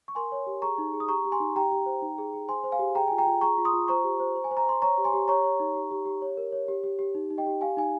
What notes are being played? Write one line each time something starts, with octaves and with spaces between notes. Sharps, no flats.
C#6
A#4 G#5 C6
C#5
G4
G#4 A#5 C#6
D#4
G#4
D#6
G4 A#5 C#6
G4
G#5 C6
D#4
G4 G5 A#5
G4
C5
D#4
G#4
G#4
C5 G#5 C6
C5
F5 G#5
G4
G#4 G5 A#5
F4 G#5
G5 A#5
F4
G#4 A#5 C#6
F4
C6 D#6
F4
C5 A#5 C#6
G4
C5
C5
G#5
C5
A#5
C5 C6
C#5 A#5 C#6
G4
G#5 C6
G4
C#5 A#5 C#6
C#5
D#4
G4
G4
G4
C#5
A#4
C#5
G4
G4
G4
D#4
D#4
D#5 G5
G4
G4 F5 G#5
D#4 G#5